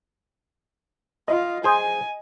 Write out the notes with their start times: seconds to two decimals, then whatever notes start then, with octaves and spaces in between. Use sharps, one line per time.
1.28 F4 D#5
1.64 G#4 C5 G#5